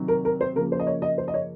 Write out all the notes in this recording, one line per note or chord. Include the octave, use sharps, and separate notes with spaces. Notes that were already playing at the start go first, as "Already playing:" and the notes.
Already playing: C3 D#3 F#3
A#4
A#4
C5
C#3 F3 A#3 A#4
C5
D#5
C#5
D#5
C5
D#5
C#5